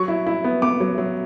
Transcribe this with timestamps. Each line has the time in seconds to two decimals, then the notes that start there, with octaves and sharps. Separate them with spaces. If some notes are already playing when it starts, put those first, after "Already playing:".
Already playing: F#3 C#6
0.08 E4
0.26 E4
0.44 B3
0.62 B3 D6
0.80 F#3
0.98 F#3